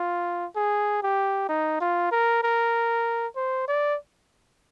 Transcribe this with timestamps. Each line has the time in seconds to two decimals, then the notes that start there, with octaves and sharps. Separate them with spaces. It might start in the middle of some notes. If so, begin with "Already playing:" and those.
Already playing: F4
0.56 G#4
1.03 G4
1.49 D#4
1.81 F4
2.12 A#4
2.43 A#4
3.36 C5
3.68 D5